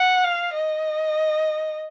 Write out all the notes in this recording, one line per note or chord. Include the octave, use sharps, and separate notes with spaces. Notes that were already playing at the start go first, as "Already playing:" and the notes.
Already playing: F#5
F5
D#5